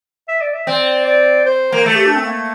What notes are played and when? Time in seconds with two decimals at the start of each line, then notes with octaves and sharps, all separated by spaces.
0.28 E5
0.41 D5
0.54 E5
0.67 C4 D5
1.06 D5
1.46 C5
1.72 A#3
1.86 A3 A4
1.96 G4
2.06 D4
2.16 C4
2.25 A#3